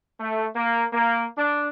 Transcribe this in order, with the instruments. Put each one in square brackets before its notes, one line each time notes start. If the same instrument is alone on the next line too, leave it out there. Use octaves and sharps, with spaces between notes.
[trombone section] A3
A#3
A#3
D4